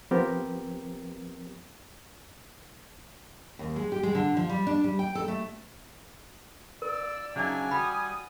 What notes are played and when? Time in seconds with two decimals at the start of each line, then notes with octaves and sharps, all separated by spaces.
0.11 F3 B3 C4 G4 A#4
3.59 D#2
3.76 G#3
3.92 G4
4.03 G#3
4.15 D3
4.37 F3
4.49 G3
4.67 D4
4.84 G3
4.99 G5
5.15 A4
5.28 A3
6.82 A#4 D5 E6
7.36 C#3 F#3 D4 D#4 E5 G#5
7.71 G3 F#4 B5 D#6